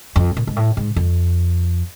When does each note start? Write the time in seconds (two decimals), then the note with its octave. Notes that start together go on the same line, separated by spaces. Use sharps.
0.16 F2
0.37 A#2
0.47 G#2
0.56 A2
0.77 G#2
0.96 F2